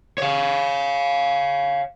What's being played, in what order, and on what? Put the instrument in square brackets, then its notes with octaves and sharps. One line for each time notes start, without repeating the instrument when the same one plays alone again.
[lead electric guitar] C#5 F5